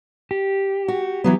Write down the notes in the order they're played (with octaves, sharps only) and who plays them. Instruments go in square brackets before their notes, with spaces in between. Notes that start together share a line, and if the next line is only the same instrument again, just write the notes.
[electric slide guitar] G4
[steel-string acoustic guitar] F#4
E3 F#3 B3